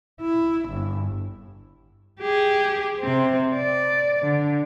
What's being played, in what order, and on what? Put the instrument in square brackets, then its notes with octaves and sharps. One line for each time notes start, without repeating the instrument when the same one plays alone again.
[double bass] E4
G1
[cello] G4 G#4
C3 C4
D5
D3